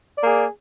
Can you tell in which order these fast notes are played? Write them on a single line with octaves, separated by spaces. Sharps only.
D5 A#3 G#4